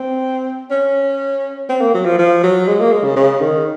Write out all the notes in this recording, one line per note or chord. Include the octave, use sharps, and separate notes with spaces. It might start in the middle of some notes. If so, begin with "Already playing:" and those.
Already playing: C4
C#4
C4
A#3
F#3
F3
F3
F#3
G#3
A#3
G#3
C#3
C#3
D#3